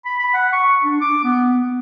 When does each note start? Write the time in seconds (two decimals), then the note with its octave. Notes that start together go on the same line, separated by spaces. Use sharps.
0.05 B5
0.19 B5
0.34 F#5
0.53 C#6
0.84 D4
1.01 D6
1.24 B3
1.53 B3